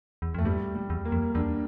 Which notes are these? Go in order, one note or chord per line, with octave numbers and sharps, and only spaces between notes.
E2
F2 A3
G2 G3
G3
E2
A#3
F2
E2 D4